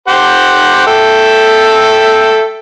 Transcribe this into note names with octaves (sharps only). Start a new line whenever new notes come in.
G4 C5 F#5
A4 E5 G5